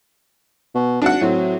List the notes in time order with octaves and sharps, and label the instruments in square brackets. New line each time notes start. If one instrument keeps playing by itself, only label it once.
[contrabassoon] B2
[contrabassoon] G#1 [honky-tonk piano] D4 F#4 F#5
[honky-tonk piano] A2 C4 [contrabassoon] F#3